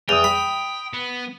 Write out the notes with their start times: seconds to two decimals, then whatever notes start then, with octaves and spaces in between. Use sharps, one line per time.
0.09 E2 G5 D#6 D#7 F7
0.24 B5
0.93 B3